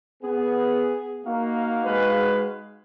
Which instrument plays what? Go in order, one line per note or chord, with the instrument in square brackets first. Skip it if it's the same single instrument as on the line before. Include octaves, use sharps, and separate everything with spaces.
[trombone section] B3 [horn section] G#4
[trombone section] A#3 [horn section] D#4 F#4 F5
[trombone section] G#3 B4